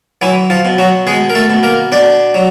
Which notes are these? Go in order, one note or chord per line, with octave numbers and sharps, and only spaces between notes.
E3 F#3 E4
F3 F4
B2
F#3 F#4
B2 G#3 G#4
A#4
A3 A4
B2
A#3 A#4
B2 D4 D5
F#3